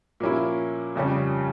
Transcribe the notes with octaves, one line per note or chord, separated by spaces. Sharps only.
A#2 F3 A#3 C#4 E4
F2 C#3 G3 C#4